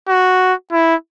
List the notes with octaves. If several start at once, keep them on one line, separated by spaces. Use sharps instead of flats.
F#4
E4